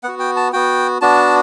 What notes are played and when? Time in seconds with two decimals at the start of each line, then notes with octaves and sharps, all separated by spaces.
0.03 B3 F#4 F#5
0.19 G5
0.36 A5
0.53 B3 F#4 G5
1.01 B3 D4 F#4 A5